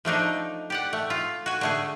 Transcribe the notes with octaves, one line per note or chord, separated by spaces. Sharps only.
F3 A3 D4 D#4
G4 D5 F#5
A3
F4
F#4 G#5
D3 A3 G#4